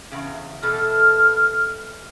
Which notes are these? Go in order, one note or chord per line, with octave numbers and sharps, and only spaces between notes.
E2 C#3
E2 B2 A4 F6